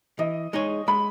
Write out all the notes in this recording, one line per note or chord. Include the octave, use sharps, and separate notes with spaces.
E3 D#5
G#3 D#4 G#4 C#5
G#3 B5